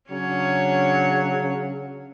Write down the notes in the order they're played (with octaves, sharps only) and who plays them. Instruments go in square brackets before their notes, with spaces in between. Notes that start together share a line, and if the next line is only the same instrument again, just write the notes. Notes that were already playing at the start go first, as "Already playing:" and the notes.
[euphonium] C#3 [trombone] F#3 [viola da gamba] C#4 D4 C#5